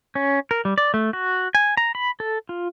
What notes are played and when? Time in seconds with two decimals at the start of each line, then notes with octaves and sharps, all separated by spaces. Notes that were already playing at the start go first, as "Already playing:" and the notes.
0.15 C#4
0.51 A#4
0.65 G3
0.78 D5
0.94 A3
1.13 F#4
1.55 G#5
1.77 A#5
1.95 B5
2.20 A4
2.49 F4